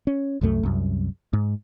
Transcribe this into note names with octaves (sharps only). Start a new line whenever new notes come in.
C#4
C2 F#2 E3 A3
C2 F#2
G#2